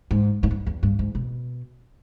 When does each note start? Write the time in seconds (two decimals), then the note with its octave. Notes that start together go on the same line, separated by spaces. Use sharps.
0.11 G#2
0.43 G#2
0.51 G2
0.66 E2
0.83 G2
0.99 G#2
1.15 B2